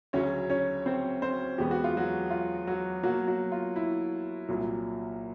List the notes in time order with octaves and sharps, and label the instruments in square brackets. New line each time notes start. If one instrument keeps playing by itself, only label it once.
[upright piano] D2 C#3 F#3 C#4 C#5
C#4 C#5
C4 C5
C4 C5
E2 B2 G#3 B3 G4
F#4
F4
F#3 F#4
F4
F#3 F#4
B2 F#3 A#3 F#4
F#3 F#4
F4
E4
C2 A#2 F#3